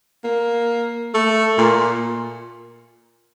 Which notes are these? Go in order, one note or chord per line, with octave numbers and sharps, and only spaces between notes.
A#3
A3
A#2